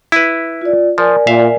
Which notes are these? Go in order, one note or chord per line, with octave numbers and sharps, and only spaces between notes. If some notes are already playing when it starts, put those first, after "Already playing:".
E4 B4
F4 D5
F3 A#4 D5 G#5
A#2 E5 F5